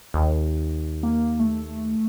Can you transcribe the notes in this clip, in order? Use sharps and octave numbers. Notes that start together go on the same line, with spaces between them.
D#2
A#3
A3